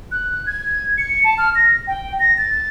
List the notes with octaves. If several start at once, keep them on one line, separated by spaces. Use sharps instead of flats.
F#6
G#6
C#7
A5
F6
A#6
G5
A#6
A6